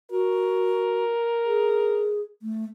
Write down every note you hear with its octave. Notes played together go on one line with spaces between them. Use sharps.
F#4 A#4
G#4
A3